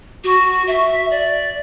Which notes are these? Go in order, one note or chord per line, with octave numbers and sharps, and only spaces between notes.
F#4
E5
D5